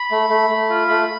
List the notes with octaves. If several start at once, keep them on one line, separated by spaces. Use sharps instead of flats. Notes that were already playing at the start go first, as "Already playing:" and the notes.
Already playing: B5
A3
A3
A3
F4
A3